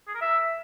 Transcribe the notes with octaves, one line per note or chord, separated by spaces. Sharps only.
G#4
A#4
E5